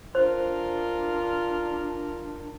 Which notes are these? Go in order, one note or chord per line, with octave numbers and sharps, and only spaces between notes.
D4 F4 A#4 C5